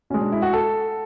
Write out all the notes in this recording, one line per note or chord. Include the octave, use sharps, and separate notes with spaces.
B2 G#3 C#4
D4
E4
F#4
A4